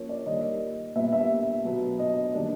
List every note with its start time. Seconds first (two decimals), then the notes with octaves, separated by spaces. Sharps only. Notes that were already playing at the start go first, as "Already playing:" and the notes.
Already playing: F3 A#3 C#4 C#5
0.09 D5
0.26 D#3 G3 A#3 D#5
0.96 A#2 G3 B3 E5
1.12 E5
1.65 B2 F#3 B3
1.99 D#5
2.34 D#3 G3 A#3 D4